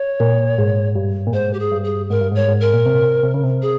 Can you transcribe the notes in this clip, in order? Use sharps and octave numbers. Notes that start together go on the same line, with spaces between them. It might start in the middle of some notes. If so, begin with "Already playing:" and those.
Already playing: C#5
A#2
G#2
G2
A#2
G#2 C5
G4
G#4
G2
G#4
G#2 A#4
G2
G#2 C#5
G#2
A#4
A#2
C3
C3
C#3
C3
G#4